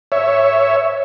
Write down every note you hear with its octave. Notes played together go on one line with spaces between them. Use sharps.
C#5 E5